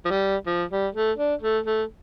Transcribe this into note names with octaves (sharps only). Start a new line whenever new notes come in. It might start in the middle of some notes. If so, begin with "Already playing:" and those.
F3
G3
F3
G3
A3
D4
A3
A3